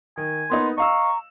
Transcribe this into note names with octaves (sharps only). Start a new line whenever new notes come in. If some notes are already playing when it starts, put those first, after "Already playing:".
D#3 G#5
A#3 B3 D#4 C6
D#5 F5 A#5 C#6 E6